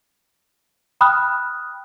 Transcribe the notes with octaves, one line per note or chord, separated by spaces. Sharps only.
G5 B5 D#6 F6 F#6